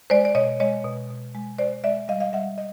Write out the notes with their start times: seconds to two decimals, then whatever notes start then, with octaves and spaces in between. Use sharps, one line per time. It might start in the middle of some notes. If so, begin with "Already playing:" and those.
0.10 G#3 C5 D5
0.25 D5
0.35 B2 C#5 D#5
0.60 G#3 C#5 D#5
0.84 B2
1.10 B2
1.35 G#3
1.58 G#3 C5 D5
1.84 G#3 D5 E5
2.08 G3 D#5 F5
2.20 D#5 F5
2.33 G3 E5 F#5
2.58 D#5